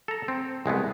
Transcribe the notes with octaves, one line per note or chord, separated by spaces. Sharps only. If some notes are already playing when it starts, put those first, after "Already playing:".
A4 A#5
C4
C2 G#3 A3 B3